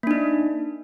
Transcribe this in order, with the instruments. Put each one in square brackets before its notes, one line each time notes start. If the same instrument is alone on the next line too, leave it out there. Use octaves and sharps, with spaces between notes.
[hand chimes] A#3
D4
D#4